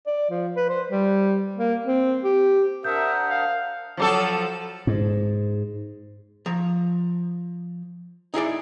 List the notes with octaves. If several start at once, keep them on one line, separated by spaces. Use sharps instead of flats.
D5
F3
B4
C5
G3
A#3
C4
G4
D4 A#4 C5 E5 F#5 A#5 D#6 G6
F5
F3 F#3 A4
G#2
F3 A#5
D#4 E4 G#4 D5